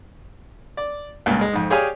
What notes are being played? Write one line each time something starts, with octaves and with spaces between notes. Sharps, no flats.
D5
C#2 G2 A#2
G#3
F2 G#2
G4 G#4 C#5 D5 F5 G#5